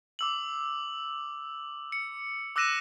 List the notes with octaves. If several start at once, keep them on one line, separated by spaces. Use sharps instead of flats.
D6 E6 F#7
C#7
D6 E6 F#6 A#6 D#7 E7